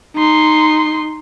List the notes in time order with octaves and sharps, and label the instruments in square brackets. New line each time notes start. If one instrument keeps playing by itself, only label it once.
[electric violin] D#4 C6